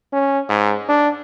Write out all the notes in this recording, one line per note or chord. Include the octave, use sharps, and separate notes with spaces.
C#4
G#2
D4